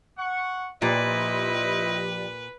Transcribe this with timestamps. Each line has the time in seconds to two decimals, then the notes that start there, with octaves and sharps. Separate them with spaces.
0.17 F#5 C#6
0.82 A#2 F3 E4 G4 B4 C5 D5 D#5